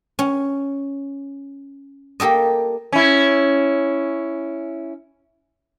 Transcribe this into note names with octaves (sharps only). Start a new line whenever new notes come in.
C#4
A#3 G4 A4 D#5
C#4 E4